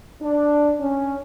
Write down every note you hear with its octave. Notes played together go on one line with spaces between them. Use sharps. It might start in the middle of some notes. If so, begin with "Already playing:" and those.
D4
C#4